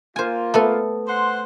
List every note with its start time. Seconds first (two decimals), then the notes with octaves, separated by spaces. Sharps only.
0.16 A#3 F4 C5 G#5
0.54 A3 B3 A4
1.07 C5 F#5 C6